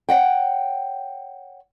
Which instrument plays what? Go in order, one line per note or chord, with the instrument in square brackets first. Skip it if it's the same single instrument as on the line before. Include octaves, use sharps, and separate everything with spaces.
[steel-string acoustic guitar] C#5 D#5 F#5 G5